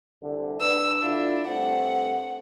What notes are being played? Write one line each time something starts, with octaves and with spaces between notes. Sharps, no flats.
C2 D3
D4 B4 E6
D3 D4 E4 F4
G2 A3 C4 F#5